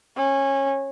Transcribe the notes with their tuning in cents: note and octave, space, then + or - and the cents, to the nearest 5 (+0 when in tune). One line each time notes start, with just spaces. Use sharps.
C#4 -20